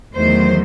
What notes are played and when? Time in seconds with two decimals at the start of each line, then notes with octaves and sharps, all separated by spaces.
0.14 E2 D#3 F#3 A3 C5